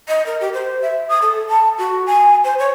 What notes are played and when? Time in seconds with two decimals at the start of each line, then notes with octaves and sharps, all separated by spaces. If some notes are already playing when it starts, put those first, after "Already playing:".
0.08 D#5
0.26 A#4
0.41 G4
0.54 C5
0.82 E5
1.09 D#6
1.22 A4
1.49 A5
1.78 F#4
2.07 G#5
2.44 C5
2.59 C#5